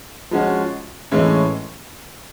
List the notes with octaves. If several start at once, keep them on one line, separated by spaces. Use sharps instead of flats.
F3 G#3 C#4 F#4
A2 E3 G#3 C#4